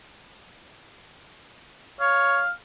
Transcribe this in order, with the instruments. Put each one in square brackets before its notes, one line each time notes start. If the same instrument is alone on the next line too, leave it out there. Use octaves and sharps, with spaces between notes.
[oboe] C#5 [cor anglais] F5